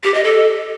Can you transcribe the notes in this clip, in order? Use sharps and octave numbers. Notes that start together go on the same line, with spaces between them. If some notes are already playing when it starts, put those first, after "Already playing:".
G4
D#5
A4